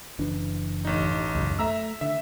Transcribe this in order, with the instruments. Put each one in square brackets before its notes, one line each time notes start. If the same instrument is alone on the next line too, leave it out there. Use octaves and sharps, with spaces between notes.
[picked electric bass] F#1 E3 D4
[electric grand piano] A1 D#4
[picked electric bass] C#2 F#2
[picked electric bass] A3 [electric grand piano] E5 A#5 E6
[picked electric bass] D3 [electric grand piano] E5